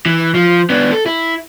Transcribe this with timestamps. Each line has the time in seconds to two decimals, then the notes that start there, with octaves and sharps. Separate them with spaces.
0.06 E3
0.35 F3
0.70 B3 D4
0.92 A4
1.06 E4